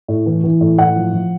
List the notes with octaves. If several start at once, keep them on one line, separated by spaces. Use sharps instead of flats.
A2
E3
E3
A2
A2 F#5
F3
F3